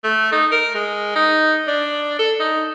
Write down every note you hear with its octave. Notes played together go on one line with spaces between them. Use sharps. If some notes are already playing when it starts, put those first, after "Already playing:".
A3
D#4
A#4
G#3
D#4
D4
A4
D#4